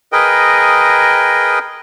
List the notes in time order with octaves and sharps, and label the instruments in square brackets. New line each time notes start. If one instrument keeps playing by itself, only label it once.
[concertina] G#4 A#4 B4 D#5 G5